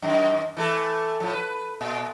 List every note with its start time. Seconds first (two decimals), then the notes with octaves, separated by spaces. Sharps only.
0.02 F#2 D#3
0.57 E3 A3 A4
1.20 A2 F3
1.33 B4
1.81 A#2